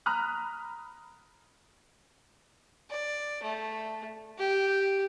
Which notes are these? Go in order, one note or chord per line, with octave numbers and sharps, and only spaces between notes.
A#5 B5 D#6 F6 F#6
D5
A3
G4